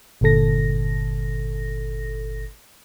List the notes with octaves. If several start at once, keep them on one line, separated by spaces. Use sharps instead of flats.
G1 A#2 D3 A4 A#6